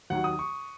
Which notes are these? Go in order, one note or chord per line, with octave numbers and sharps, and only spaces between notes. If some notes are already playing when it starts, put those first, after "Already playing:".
D#2 D#3 F#3 F#5
D#6
C#6